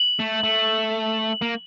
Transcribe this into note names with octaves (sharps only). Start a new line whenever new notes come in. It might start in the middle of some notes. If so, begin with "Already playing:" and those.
Already playing: F#7
A3
A3
A#3